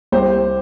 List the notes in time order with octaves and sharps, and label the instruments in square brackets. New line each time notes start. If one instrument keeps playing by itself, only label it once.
[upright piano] C2 G4 C5